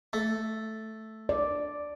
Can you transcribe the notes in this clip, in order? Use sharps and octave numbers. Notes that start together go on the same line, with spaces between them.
A3
D5